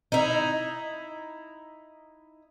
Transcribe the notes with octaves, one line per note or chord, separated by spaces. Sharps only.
D#4 E4